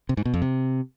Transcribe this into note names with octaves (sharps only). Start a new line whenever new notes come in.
C3
G#2
B2
F2
C3